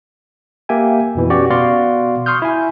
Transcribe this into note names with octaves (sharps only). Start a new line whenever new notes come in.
A#3 G4 E5 G5 G#5
F2 B2 E3
C#4 F#4 G4 D5
B2 B3 F#4 D5 F5 C6
C6 C#6 D#6 F6 G6
E4 G#5